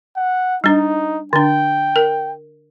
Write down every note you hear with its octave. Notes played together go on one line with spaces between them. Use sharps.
F#5
G3 D4 D#4
D3 D4 G5
A#4